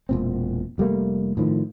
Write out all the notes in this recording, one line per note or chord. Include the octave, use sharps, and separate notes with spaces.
E1 A#2 C4
F1 G3 A3 A#3
A2 D#3 F3